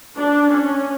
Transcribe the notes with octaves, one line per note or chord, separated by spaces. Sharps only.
D4
C#4